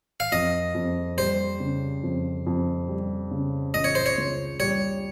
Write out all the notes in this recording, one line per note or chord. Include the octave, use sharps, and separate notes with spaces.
F5
F2 D#5
F2
G3 C5
C#3
F2
F2
G3
C#3
C#2 D#5
C#5
C5
C#5
C#2
G3 C#5